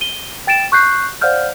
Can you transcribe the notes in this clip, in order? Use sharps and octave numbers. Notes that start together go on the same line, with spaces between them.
D#7 G7
G5 A6 D7 E7
C#6 F#6 G6 C7
C5 D5 F5 F#5 F6 G6